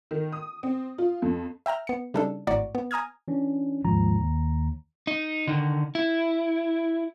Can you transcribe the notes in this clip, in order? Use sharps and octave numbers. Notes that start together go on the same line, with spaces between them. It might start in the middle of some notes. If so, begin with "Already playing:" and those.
D#3
D#6
C4
F4
F2
E5 G5 A#5 F6
B3 C#7
C#3 G3 D4 D#4 A4
G#1 A2 F#4 D5 A#5 C#6
B3
G#5 A#5 D#6 F6 G#6
E3 C#4 D4
D#2 G#2 F3 A#5
D#2
D#4
D3 D#3
E4